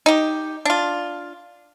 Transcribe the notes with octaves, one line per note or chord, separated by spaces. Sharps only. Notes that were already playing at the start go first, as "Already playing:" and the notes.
D#4 G4
D4 F4